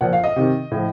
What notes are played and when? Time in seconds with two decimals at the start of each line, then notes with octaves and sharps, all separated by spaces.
0.01 A#2 F3 F#5
0.13 F5
0.24 D#5
0.36 C3 D#3
0.71 A2 F3